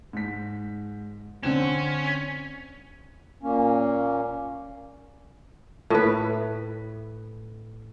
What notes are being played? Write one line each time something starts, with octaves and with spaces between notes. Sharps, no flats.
G#2 B6
D3 C4 C#4 E7
A#2 A#3 C#4
A2 B4